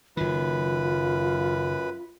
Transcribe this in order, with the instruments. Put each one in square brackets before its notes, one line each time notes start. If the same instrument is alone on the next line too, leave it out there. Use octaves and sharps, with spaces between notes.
[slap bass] F#1 D#3 [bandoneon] F#2 B4 [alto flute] F4